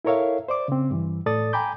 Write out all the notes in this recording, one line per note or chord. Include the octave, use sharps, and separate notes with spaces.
E4 A4 A#4 C#5 E5 F5
C5 D5 D6
C#3 C4
G2 E3
A2 A4 D5 D#6 A6
G5 G#5 A#5 B5 D6 G6